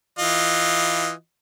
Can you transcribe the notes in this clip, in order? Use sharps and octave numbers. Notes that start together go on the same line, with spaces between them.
E3 F4 D#5